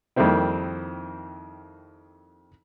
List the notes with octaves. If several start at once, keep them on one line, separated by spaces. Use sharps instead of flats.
F2 D#3 G3 A#3 C4 E4